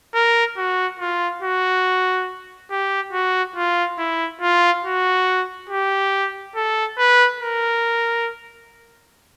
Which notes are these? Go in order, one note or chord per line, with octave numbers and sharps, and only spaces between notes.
A#4
F#4
F4
F#4
G4
F#4
F4
E4
F4
F#4
G4
A4
B4
A#4